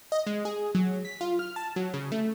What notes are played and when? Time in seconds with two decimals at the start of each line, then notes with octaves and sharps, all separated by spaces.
0.12 D#5
0.27 G#3
0.45 G#4
0.75 F#3
1.05 B6
1.21 F4
1.39 F6
1.56 A5
1.76 F#3
1.94 C#3
2.12 A3